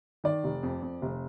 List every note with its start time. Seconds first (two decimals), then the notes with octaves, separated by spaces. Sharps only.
0.24 D#3 D5
0.44 F1
0.63 F2
0.82 F2
1.02 F1